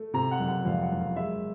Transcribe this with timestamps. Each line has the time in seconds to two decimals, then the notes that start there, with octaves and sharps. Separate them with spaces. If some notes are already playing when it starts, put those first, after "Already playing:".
Already playing: A3
0.14 C3 A#5
0.31 F#5
0.39 F#1
0.48 F#5
0.65 F2 F5
0.82 F#5
0.91 F#1
1.00 F5
1.16 G#3 E5